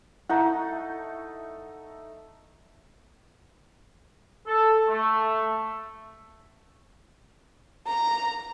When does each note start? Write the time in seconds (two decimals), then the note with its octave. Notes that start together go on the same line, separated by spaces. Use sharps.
0.30 A3 D#4 E4 F#5
4.47 A4
4.89 A3
7.86 A#5